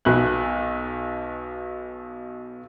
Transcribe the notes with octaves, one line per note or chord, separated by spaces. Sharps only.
B1 B2 F#6